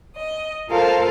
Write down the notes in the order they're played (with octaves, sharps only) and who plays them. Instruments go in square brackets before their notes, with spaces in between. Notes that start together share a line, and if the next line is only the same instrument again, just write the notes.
[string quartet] D#5
F4 A4 A#4 C5 F5 A5